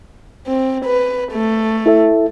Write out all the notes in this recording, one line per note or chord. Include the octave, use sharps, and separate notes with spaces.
C4
B4
A3
E4 A4 E5